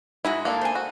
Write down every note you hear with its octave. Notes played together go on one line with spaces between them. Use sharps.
G#2 G#3 E4 F#4
A#3 D4 A4
C5 G#5
F#4